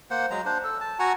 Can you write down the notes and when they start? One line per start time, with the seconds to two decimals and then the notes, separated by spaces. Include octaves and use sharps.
0.11 A#3 C5 F#5
0.30 F#3 G#3 A#5
0.45 D4 C5
0.64 A4
0.81 A5
0.99 F#4 F#5 G#5 A#5